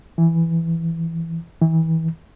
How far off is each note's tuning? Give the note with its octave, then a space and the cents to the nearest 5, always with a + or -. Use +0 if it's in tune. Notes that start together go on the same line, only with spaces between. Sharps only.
E3 +5
E3 -30